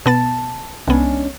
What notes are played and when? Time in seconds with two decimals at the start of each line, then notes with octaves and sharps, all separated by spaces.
0.06 B2 B3 A5 A6
0.88 C2 G#3 B3 C#4 D4